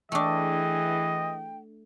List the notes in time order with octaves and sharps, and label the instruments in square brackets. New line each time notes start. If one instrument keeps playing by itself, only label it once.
[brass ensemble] E3 G#4 [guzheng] A3 D4 [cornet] D#5 [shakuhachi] G5